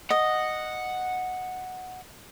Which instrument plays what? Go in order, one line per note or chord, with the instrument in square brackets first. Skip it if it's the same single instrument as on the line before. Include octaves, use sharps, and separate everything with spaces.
[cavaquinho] D#5 [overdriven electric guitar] F#5